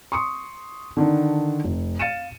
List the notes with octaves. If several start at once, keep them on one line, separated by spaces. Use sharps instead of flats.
C6 C#6 D#6 C#7
D3 D#3 D4
F1
F5 A6 C#7 D#7 E7